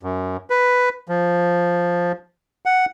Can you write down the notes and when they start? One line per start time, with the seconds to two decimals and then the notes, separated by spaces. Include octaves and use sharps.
0.03 F#2
0.50 B4
1.08 F3
2.66 F#5